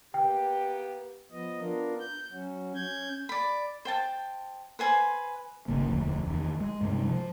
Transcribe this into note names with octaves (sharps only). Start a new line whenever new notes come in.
A#3 B3 G4 G5
F3 B3 D#5
B3 D4 F4 A#4
G6
F#3 C#4 F#4
C#4 G6 G#6
D5 B5
C5 G5 A5
B4 C5 G#5 C6
G#1 C#3 A#3
E1 D2 F3
E2 D#3
G#3
G2 C3 G3 G#3
F3